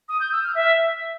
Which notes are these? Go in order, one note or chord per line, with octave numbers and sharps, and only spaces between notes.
D#6
G6
E6
F6
E5